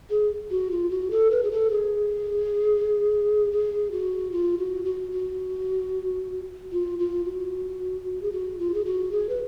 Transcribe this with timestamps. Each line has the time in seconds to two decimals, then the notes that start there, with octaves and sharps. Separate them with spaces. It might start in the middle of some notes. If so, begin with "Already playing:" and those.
0.10 G#4
0.51 F#4
0.71 F4
0.91 F#4
1.11 A4
1.31 B4
1.43 G#4
1.52 A4
1.71 G#4
3.52 G#4
3.91 F#4
4.32 F4
4.58 F#4
4.85 F#4
5.12 F#4
6.72 F4
6.99 F4
7.25 F#4
8.22 G#4
8.32 F#4
8.59 F4
8.74 G#4
8.85 F#4
9.12 G#4
9.29 B4